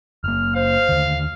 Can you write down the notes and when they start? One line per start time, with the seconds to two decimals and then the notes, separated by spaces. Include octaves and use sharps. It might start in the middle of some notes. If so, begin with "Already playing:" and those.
0.24 F#1 A#3 F6
0.55 C5 F5
0.89 D#2 D3